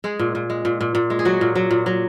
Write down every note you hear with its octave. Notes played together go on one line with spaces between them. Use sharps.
G#3 G#4
A#2
A#2
G#3
A#2
A#2
A#2
G#3
G#4
F#3 F#4
A#2
F#3
A#2
F#3